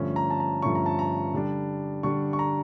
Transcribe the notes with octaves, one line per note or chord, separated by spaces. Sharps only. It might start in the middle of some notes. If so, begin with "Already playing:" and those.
Already playing: G2 D3 F3 A3 C#4
A#5
A5
A#5
G2 D3 F3 A3 C#4 C#6
A#5
A5
A#5
D3 G3 D4
D3 G3 D4 C#6
C#6
A#5